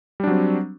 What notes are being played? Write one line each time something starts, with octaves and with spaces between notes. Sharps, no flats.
F#3 G3 C4 D4